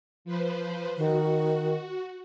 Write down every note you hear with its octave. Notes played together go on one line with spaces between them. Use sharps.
F3 B4 C5
D#3 F#4